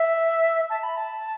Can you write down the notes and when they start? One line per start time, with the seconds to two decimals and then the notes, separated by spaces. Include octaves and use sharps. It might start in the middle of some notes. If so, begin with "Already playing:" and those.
Already playing: E5
0.70 A5
0.83 B5
0.97 A5